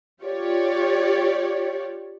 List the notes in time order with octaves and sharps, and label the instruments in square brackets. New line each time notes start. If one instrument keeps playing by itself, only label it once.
[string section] F4 G4 C#5 D5